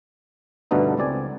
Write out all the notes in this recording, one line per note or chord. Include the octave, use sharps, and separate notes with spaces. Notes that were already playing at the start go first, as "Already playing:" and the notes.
G2 B2 D3 A3 B3 D#4
C#2 C4 D5 G#5